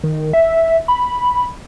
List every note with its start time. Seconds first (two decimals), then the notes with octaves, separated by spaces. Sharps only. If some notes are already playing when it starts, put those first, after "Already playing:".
0.04 D#3
0.33 E5
0.88 B5